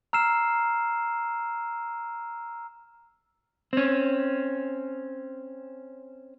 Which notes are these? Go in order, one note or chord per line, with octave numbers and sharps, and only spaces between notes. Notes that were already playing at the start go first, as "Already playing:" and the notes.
A#5 E6 F6 C7 E7
C4 C#4